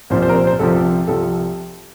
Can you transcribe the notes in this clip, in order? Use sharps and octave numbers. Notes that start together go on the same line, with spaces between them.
C2 A#2 F3 C5
C5
A#4
C5
C5
C2 C3 F3 A4
C2 C3 F3 A4